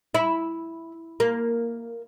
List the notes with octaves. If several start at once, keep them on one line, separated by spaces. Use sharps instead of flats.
E4
A#3